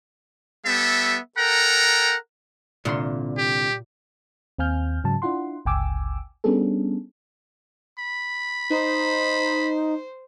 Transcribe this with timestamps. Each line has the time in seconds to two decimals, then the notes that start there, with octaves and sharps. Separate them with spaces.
0.66 G3 B3 A4 E5
1.38 A4 A#4 F#5 G5 A#5
2.85 C2 A#2 D3 C6
3.38 G4
4.58 D#2 C4 F5 G#5 F6 G6
5.04 G#2 C#3 F#3 A5
5.22 D4 E4 F4 F#5 C6
5.65 G1 C#2 G5 G#5 D6 E6
6.44 G3 B3 C#4 D4 G#4 A4
7.99 B5
8.70 D#4 C5